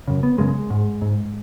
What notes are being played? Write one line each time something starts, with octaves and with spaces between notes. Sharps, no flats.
F#2 C#3
B3
F#2 C#3 G#3
G#2
G#2